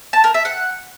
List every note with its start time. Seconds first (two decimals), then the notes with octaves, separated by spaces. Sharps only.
0.13 A5
0.24 A#4
0.34 E5
0.45 F#5